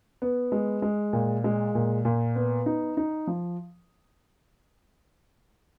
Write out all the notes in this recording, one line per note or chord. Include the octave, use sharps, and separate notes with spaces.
B3
G#3
G#3
A#2
G#3
A#2
A#2
B3
D#4
D#4
F3